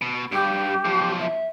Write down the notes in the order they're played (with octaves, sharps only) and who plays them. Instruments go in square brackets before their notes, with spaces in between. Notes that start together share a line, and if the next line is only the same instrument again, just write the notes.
[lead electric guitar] B2
[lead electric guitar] G2 [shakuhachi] G4
[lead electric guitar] B1 F3
[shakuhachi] E5